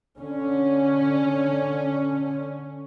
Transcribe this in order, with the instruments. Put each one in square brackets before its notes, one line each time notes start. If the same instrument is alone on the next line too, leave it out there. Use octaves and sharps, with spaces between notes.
[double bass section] D3 [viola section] C#4